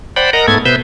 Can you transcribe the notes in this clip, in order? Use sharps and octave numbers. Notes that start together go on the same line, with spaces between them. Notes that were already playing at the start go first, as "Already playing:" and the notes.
C5 D5 F#5 G5 B5
A#4 D#5 F#5 A#5
G#2 A3 B3 A4 G#6
B2 B3 B4 C5 E5 G6